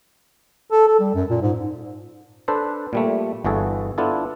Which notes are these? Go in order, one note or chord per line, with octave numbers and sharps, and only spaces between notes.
A4
A4
G3
F#2
A#2
G#2
D4 A4 B4 C5
A#2 G3 A3
G1 E3 F#4 G#4 A4
B3 D4 E4 F4 A4